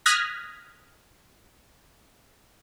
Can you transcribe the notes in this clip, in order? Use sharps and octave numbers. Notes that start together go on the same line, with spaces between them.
D#6 F6 F#6 G#6 A#6 B6